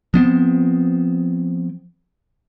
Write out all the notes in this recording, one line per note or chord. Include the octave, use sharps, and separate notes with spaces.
F3 B3 C4